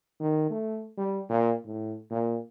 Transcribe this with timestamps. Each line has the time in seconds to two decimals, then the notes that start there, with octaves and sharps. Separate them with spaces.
0.20 D#3
0.50 A3
0.97 G3
1.29 A#2
1.65 A2
2.11 A#2